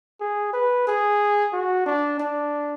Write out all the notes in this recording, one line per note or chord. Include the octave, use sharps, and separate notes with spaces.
G#4
B4
G#4
F#4
D4
D4